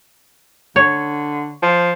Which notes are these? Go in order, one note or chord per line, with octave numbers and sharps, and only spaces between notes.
D3 C#5
F3